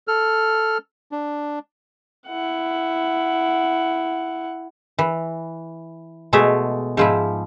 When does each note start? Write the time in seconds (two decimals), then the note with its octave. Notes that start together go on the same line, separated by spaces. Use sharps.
0.08 A4 F6
1.12 D4
2.28 E4 F#5
4.99 E3
6.33 B2 G#3 A3 G#4 E5
6.97 G#2 F3 E4